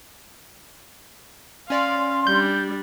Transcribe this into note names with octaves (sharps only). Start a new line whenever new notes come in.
C#4 D5 F5 C6
G3 D4 G6